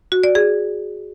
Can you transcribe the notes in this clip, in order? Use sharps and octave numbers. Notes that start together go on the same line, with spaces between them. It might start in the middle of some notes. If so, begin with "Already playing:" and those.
F#4
D5
G#4